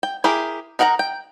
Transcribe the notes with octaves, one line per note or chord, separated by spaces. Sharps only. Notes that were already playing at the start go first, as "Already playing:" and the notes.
G5
E4 G4 G#4 A#4
D#4 A#4 F#5 G5 A#5
G5